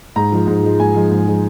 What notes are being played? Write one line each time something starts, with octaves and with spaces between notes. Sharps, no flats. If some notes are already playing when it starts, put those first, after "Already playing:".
G#2 A#5
F3 G#3
G#2
F3 G#3
G#2 G#5
F3 G#3
G#2
F3 G#3